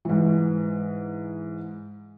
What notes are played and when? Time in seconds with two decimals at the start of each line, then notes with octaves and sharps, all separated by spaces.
0.05 G#2 E3